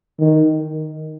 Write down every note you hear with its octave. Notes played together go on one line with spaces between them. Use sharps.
D#3